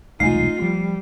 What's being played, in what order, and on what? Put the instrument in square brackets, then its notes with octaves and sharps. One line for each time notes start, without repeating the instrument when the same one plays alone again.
[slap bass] E1 C2 G#3 [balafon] A3 G#5 [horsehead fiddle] D#4 F4 [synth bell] C7
[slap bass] F3 [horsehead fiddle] G3